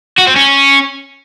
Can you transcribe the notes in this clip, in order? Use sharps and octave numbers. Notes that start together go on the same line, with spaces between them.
F#4
C4
C#4